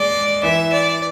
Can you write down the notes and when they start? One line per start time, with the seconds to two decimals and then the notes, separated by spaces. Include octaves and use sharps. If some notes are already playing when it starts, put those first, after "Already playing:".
Already playing: G#3 D5
0.43 E3 E5
0.73 D5